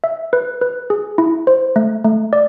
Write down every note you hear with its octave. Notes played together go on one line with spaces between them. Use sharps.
E5
B4
B4
G#4
E4
C5
A3
A3
D5